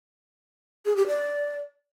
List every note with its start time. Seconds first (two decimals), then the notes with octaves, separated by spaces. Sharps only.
0.86 G#4
0.96 G4
1.07 D5